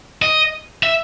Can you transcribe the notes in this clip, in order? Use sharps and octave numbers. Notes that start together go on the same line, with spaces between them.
D#5
E5